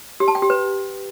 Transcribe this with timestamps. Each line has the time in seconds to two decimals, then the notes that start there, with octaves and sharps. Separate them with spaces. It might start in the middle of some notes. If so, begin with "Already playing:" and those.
0.20 G4
0.28 A5
0.35 G5
0.42 G4
0.50 B4